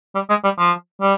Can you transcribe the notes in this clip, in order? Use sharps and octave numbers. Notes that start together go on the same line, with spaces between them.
G3
G#3
G3
F3
G3